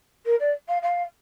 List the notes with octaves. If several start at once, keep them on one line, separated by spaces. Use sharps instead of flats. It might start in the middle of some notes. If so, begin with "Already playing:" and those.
A#4
D5
F5
F5